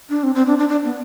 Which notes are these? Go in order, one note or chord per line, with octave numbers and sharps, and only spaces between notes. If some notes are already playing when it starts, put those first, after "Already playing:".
D4
C4
C4
D4
D4
D4
B3